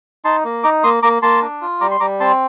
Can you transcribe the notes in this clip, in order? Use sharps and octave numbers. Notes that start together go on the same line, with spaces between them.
D#4 A5 C6
A#3
D#4 A#5 D6
A#3 C6 D#6
A#3 A#5 D6
A#3 A5 C6
D4
F4
G3 A#5 D6
C6
G3 A#5 D6
C4 A5 C6